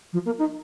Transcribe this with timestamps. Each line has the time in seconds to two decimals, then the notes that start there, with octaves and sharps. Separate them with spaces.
0.12 F3
0.25 A#3
0.38 D#4